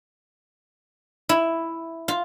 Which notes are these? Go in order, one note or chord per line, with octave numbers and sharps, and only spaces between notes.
E4
F4